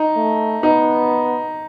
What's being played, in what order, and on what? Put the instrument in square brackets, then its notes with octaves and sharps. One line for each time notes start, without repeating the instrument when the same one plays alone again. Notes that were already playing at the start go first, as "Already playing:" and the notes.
Already playing: [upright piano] D#4
[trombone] A3
[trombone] B3 [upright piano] D#4